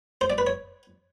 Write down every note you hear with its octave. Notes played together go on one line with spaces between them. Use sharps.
C5
D5
B4
C#5